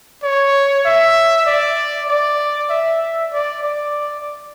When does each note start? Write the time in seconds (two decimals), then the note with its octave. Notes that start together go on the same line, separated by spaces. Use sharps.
0.23 C#5
0.85 E5
1.46 D5
2.08 D5
2.70 E5
3.33 D5
3.63 D5